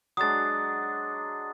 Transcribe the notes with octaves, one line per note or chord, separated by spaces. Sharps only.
F#3 G#3 D4 D#6 A6